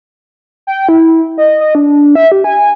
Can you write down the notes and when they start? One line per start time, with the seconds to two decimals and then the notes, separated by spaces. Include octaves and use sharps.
0.67 G5
0.89 E4
1.38 D#5
1.61 D#5
1.75 D4
2.15 E5
2.32 G4
2.44 G#5